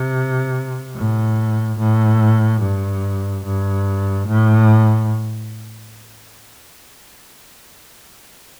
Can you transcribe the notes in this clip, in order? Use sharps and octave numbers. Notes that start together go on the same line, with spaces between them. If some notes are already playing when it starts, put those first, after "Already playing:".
Already playing: C3
A2
A2
G2
G2
A2